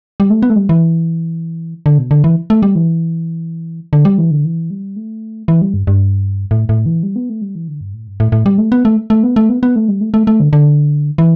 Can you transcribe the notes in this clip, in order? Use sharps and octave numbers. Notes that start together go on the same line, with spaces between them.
G3
A3
B3
A3
G3
E3
D3
B2
D3
E3
A3
G3
E3
D3
G3
E3
D3
E3
G3
A3
E3
G3
G2
G2
A2
A2
E3
G3
B3
A3
G3
E3
D3
G2
A2
G2
A2
A2
G3
A3
B3
A3
A3
B3
A3
B3
B3
A3
G3
A3
A3
A3
D3
D3
E3